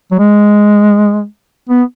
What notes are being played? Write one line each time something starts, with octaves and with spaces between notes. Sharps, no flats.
F#3
G#3
B3